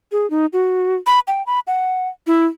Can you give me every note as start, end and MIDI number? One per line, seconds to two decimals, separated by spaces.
0.12 0.29 68
0.30 0.46 63
0.53 0.96 66
1.07 1.20 83
1.28 1.45 79
1.47 1.60 83
1.67 2.08 78
2.27 2.45 64